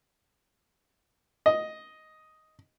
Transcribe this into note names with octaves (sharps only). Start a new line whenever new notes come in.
D#5